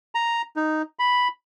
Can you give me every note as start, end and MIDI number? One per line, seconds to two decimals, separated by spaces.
0.15 0.42 82
0.56 0.82 63
0.99 1.28 83